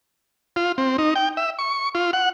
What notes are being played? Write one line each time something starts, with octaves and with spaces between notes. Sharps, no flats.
F4
C4
D#4
G5
E5
C#6
F4
F#5